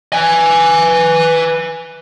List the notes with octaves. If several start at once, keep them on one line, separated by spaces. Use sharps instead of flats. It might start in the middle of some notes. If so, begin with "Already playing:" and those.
B4 G#5